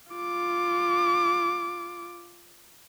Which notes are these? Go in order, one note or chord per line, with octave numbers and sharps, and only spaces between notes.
F4 D6